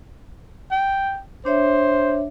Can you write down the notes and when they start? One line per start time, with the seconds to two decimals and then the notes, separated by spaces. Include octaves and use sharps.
0.71 G5
1.45 D4 C5 C#5 E5